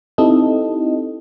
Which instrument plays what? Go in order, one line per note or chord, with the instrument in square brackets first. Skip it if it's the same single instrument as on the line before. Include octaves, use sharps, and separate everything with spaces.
[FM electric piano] C4 D#4 E4 G4 A4 D#5